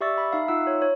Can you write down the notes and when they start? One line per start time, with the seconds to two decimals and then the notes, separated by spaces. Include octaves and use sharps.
0.01 G4 D5 E5 C#6 E6 A6
0.18 B5
0.32 D#4 E5 F5
0.48 D#4 F4 E5 F#5 E6
0.67 C#5
0.82 C#5